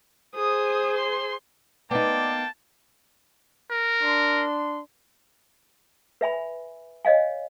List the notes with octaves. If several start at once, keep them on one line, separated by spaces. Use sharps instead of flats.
G#4 C5 D#6
C6
A#3 B3 D#4 D5 G5 A5
A#4
D4 C6
B4 E5 G#5 B5
C#5 D#5 F5 G#5